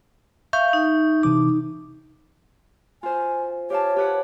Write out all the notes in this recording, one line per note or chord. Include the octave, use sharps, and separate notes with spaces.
E5 F5 C#6 G6
D#4
C3 E3 D6
F4 C5 G#5
G4 C#5 F5 A5
G4 B4 F#5